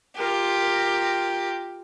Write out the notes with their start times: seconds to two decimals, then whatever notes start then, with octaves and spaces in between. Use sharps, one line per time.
0.17 F4 G4 A#4